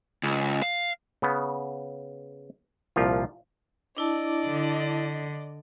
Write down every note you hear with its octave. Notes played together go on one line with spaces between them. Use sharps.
C#2
F5
C#3 B3
C2 A#2 F3 F4
D4 E4 D5 D#5 A5
D3